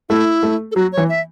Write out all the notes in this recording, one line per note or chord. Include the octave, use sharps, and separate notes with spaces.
A3 E4
A3
A4
F#3 F#4
C#5
E3
E5